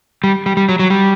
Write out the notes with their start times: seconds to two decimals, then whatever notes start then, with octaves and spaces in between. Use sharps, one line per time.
0.24 G3
0.46 G3
0.57 G3
0.69 F#3
0.79 F#3
0.90 G3